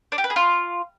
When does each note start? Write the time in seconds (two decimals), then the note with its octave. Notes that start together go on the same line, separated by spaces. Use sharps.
0.12 D4
0.18 G4
0.24 B4
0.30 G#4
0.36 F4